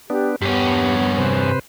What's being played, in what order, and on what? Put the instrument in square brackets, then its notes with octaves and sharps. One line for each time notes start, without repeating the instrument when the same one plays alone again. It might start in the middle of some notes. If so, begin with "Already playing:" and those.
[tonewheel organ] B3 D4 [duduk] G4
[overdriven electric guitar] G2 C#4 [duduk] B3 [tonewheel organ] G4
[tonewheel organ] C3 B4 C5